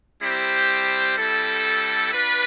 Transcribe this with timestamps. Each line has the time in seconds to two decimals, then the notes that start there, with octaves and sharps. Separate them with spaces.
0.21 G3 C4 E4 G4 C5
1.18 G3 C4 E4 A4
2.13 D4 F4 B4